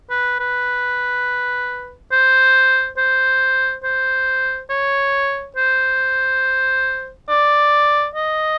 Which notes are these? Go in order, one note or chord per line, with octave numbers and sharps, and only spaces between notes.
B4
B4
C5
C5
C5
C#5
C5
D5
D#5